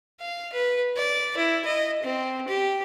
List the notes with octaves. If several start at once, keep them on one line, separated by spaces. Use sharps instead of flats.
F5
B4
D5
E4
D#5
C4
G4